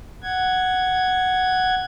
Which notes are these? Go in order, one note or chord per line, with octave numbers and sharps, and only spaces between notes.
F#5 G#6